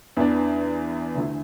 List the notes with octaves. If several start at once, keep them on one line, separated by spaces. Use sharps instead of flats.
E2 E3 B3 D4
D2 D3 A3 E4